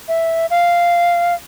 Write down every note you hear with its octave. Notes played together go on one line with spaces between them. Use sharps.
E5
F5